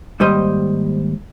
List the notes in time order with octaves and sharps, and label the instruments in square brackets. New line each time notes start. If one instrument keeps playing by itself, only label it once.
[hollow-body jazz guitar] D#2 G#2 G3 C5 D#5